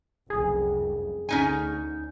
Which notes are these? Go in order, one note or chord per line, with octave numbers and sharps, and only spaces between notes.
F1 C2 F#2 G#4
D2 C#4 D#4 G#5